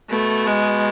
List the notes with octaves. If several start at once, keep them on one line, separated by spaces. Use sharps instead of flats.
B2 A3
G#3